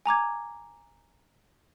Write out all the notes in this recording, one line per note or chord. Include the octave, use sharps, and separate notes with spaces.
G#5 A#5 D6 G#6